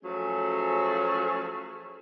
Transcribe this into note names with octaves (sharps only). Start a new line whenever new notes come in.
F3 F#3 A3 C#4 G#4